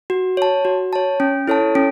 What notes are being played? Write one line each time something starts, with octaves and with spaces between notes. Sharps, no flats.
F#4
C#5 A5
F#4
C#5 A5
C#4
E4 A4 C#5 A5
C#4